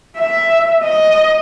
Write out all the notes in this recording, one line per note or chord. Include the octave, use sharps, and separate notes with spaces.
E5
D#5